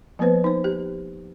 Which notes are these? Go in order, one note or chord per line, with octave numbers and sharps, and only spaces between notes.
F3 A#3 B3 B4 C5
D#4 C5
G4